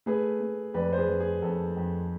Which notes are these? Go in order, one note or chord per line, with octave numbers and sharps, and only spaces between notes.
A3 G#4 B4
A3
F2 B4 D5
C5
G#4 B4
F2
G#4
F2 A4
F2